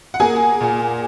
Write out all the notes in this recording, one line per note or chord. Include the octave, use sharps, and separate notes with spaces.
F#5
A#3 G#4 G#5
A#2